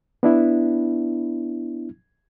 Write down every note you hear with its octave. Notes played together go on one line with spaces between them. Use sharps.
B3 D4 E4